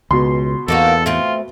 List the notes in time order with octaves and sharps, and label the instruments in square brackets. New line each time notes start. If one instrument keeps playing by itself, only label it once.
[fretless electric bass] C#2 [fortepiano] B2 C6
[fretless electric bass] E2 [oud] A#3 D#4 F#4 [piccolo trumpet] A4
[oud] A3 C4 [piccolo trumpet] F4